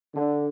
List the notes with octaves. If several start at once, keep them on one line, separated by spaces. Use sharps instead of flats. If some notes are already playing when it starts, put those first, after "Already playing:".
D3